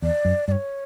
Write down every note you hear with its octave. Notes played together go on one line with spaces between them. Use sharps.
E2 D5
F#2
G2 D5
C#5